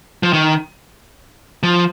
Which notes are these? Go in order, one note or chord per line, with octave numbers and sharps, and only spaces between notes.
F3
D#3
F3